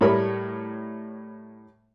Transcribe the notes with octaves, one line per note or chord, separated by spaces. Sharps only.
A2 G3 A3 A#4 C#5 B5